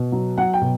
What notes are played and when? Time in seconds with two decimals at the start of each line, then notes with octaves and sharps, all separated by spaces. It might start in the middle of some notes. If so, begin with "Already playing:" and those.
Already playing: B2
0.12 F#3
0.37 F#3 F#5
0.54 G5
0.61 B2